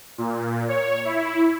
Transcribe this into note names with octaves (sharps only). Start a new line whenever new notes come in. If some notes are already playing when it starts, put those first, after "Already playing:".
A#2
C#5
E4